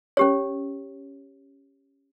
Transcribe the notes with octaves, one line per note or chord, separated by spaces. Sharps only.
C#4 G4 C#5